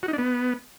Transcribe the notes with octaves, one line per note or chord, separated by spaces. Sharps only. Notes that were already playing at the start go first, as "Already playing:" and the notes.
F#4
D#4
D4
B3